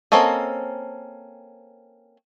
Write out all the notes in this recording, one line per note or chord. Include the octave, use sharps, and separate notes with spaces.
A#3 C4 C#4 A4 D#5